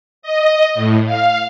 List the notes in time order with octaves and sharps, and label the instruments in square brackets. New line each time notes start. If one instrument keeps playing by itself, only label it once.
[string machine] D#5
A2
F5